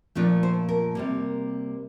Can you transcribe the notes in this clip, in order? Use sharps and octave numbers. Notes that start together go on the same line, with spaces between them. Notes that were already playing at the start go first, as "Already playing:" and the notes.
A#2 F3 A3 D4
C5
A#4
C3 G3 A#3